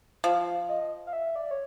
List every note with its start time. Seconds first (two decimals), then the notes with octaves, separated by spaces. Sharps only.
0.24 F3 F5
0.69 D#5
1.07 F5
1.13 E5
1.36 D5
1.51 C#5